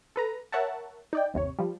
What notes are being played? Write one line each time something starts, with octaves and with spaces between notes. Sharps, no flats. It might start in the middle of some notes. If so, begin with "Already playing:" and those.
A4 B4 A#5
A#4 C#5 E5 F#5 A5
D#4 D5 G5
G1 D#2 C3 C#5
F3 G3